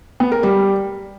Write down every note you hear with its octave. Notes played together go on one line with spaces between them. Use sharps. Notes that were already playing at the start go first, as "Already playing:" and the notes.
B3
A#4
G3